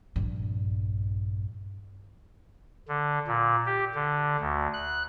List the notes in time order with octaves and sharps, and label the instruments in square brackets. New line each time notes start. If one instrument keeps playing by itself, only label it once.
[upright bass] A#1 G2
[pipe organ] D3
A#2
G4
D3
D2
F#6